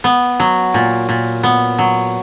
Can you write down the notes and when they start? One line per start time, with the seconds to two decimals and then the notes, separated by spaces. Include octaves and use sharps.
0.04 B3
0.40 F#3
0.74 A#2
1.09 A#2
1.43 B3
1.79 F#3